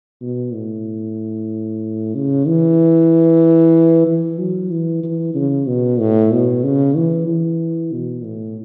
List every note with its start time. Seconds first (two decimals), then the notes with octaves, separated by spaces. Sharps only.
0.22 B2
0.53 A2
2.15 C#3
2.47 E3
4.06 E3
4.39 F#3
4.71 E3
5.03 E3
5.35 C#3
5.67 B2
5.99 A2
6.32 B2
6.64 C#3
6.96 E3
7.28 E3
7.92 B2
8.24 A2